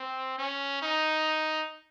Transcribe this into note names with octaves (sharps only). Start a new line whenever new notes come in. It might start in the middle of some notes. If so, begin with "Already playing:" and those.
Already playing: C4
C#4
D#4